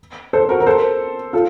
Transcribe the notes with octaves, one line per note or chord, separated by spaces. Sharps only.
A4 C5
F#4 A#4
A#4
A4 C5
F4 A4